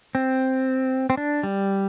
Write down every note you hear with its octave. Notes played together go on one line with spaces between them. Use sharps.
C4
C4
D4
G3